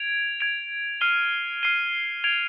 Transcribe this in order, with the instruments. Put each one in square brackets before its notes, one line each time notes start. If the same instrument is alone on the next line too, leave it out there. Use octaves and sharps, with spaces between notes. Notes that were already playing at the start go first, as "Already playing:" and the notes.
Already playing: [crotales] G#6 D7 F7
G#6 D7 F7
F6 C7 D#7 G7
F6 C7 D#7 G7
G#6 D7 F7